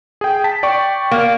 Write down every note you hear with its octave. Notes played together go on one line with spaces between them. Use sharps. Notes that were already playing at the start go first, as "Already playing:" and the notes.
G#4 G5
A5 B6
D5 G5 C#6
A#3